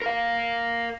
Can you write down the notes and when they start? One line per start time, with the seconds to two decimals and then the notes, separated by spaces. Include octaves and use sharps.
0.02 A#4 F5